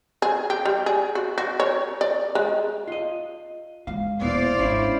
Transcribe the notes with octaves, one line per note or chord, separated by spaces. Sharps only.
G#4
G4
G3
G#4
F#4
F#4
C#5
D5
G#3
F4 D#5
D#3 G#3 F5
D#1 B3 E4 C5 D5 F5
G#1 C#4 D4 E4